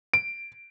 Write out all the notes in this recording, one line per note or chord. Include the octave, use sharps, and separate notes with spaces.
D7